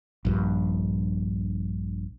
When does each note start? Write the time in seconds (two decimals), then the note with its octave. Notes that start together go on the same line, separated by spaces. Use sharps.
0.25 A#1 G2